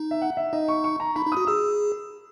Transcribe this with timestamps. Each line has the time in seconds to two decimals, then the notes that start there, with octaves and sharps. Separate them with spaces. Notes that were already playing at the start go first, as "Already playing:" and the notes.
Already playing: D#4
0.11 E5
0.22 F#5
0.37 E5
0.53 D#4 D#5
0.68 C#6
0.84 C#6
1.00 A#5
1.16 D#4 B5
1.26 D#4
1.32 F#4 D#6
1.47 G#4 E6